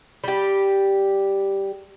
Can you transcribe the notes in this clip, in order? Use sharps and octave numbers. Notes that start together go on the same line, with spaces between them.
G3 G4